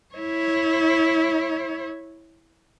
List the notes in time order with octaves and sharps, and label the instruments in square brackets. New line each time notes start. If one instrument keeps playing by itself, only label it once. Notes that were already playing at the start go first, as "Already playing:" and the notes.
[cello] E4 C#5